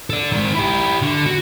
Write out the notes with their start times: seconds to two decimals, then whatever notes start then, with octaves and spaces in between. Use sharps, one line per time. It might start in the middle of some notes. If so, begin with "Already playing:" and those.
0.10 A4 D5
0.32 D#3 G#3
0.55 E4 G4
1.02 D3
1.26 F#4